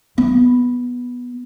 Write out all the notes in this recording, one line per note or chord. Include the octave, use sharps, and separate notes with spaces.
B3